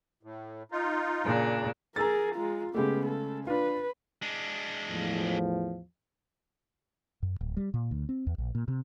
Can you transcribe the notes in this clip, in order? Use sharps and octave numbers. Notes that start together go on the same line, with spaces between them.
A2
D#4 F4
A#2 C#3 D4
G#4 A#4 A#5 E6 A6
G#3 F4
C#3 G#3 A3 B3 G4
A4
D4 F4 B4
G#3 D4
E2 A2 F3
F#2
D1
G3
A#2
D2
C4
E2
A#1
A#2
C3